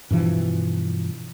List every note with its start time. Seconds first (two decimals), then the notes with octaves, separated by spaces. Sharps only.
0.10 G2 B2 E3 F3